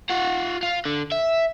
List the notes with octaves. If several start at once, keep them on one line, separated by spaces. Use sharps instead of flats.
F4 F#5
F4
D3
E5